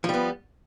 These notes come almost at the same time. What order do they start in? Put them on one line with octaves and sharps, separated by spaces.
F3 G3 B3